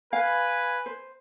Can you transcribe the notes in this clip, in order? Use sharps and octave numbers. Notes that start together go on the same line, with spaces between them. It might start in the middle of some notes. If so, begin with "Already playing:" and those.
B4 F5 G#5
C5